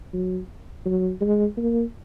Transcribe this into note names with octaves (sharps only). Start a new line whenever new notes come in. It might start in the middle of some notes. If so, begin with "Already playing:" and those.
F#3
F#3
G#3
A#3